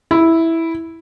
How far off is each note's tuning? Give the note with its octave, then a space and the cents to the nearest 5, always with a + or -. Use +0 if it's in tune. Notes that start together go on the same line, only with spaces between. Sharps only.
E4 -5